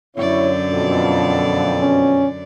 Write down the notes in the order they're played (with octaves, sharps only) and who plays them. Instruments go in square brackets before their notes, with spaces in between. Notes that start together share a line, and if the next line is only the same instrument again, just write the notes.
[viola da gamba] F#2 D3 D5 [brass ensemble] E4 C#5
[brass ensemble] F2 B2
[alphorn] C#4